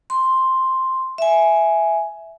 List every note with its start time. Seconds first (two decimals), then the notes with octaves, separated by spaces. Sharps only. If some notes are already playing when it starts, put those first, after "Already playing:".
0.10 C6
1.18 E5 G#5